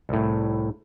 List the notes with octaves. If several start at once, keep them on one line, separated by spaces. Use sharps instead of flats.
C2 A2